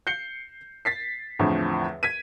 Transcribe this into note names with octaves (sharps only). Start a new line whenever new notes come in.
G6 C7 C#7 G7
A6 B6 C7
E2 A2 D3 F3 C4
G#6 B6 D#7